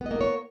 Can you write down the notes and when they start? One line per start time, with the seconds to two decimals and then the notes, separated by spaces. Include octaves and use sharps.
0.01 B3
0.06 D#5
0.11 A#3
0.16 A#4
0.21 C#5